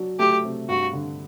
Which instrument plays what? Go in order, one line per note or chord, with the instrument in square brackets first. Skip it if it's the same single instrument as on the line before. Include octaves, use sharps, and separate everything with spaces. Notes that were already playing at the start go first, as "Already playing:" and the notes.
Already playing: [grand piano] F#3 D4
[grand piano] A3 [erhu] G4
[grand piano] C3
[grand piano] G2 [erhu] F#4
[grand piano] D3